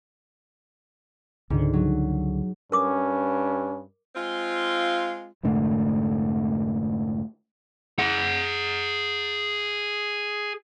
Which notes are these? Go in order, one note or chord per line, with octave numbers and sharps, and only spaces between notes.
C#2 G#2 D3
F#3
G2 C#4 A#4 D6 D#6
G#3 C4 F4
F1 G#2 D3 A3
G#4 F#5